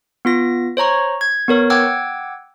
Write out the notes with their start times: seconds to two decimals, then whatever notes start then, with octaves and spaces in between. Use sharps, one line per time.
0.25 B3 F4 A#6
0.77 C5 C#5 A#5 C#6
1.21 G#6
1.48 B3 A#4 C#5
1.70 F#5 G5 D6 E6 G#6